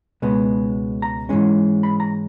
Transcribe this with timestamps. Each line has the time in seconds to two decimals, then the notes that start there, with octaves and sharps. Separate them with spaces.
0.22 C#2 B2 G#3 B3
1.02 A#5
1.29 G#2 E3 G#3 C#4
1.83 B5
2.00 A#5